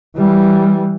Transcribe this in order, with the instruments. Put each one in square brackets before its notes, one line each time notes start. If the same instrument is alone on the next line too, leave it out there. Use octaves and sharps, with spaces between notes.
[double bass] E3 G3